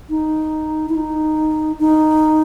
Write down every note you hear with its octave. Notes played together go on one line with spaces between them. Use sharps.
D#4
E4
D#4
D#4